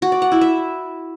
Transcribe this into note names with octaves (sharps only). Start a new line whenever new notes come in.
F#4
D5
F#5
E4
E5